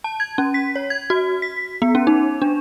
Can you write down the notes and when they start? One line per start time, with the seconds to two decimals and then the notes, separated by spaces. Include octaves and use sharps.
0.04 A5
0.20 G#6
0.38 C#4
0.54 B6
0.76 C#5
0.90 G#6
1.10 F#4
1.42 B6
1.82 B3
1.95 C#4
2.07 D#4
2.42 D4